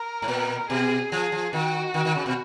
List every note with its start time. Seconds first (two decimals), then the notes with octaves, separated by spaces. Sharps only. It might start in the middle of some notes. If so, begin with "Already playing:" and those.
Already playing: A#4
0.22 G#2
0.28 A#2
0.69 B2 G#4
1.12 F3 G#4
1.32 F3
1.53 D#3 F#4
1.94 D#3
2.05 D#3
2.15 C#3
2.26 B2